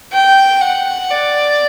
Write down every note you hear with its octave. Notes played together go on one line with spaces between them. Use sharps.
G5
F#5
D5